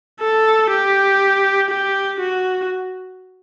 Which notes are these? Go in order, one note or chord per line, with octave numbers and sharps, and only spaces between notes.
A4
G4
G4
F#4